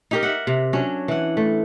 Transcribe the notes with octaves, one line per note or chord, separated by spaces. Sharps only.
D#4 G4 A#4
E5 F#5
C3
F#3 C#4 D4
E3 F#5
A3